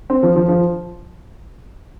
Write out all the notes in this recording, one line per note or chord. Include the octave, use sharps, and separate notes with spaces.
C4
F3
F3
F3